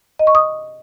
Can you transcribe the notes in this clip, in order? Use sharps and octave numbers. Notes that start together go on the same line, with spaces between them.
D#5
C#6
D#6